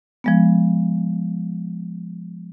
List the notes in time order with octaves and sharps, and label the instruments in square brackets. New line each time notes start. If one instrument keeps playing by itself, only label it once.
[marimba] F3 G#3 B3